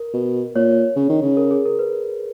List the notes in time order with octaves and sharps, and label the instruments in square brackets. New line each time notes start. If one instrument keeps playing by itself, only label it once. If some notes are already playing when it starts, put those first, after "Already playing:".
Already playing: [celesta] A#4
[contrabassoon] B2
[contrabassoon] A#2 [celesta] C#5
[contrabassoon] C#3
D#3
C#3
[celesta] A#4
G#4
A#4
B4